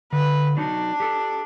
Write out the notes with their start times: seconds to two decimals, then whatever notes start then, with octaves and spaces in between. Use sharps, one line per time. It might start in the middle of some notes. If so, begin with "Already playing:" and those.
0.12 D3 B4
0.57 F#3 D4 D#4
1.00 G4 A4